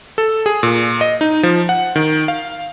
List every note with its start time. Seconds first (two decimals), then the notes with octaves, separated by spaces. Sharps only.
0.18 A4
0.46 G#4
0.63 A#2
1.01 D#5
1.21 D#4
1.43 F3
1.69 F#5
1.96 D#3
2.28 F5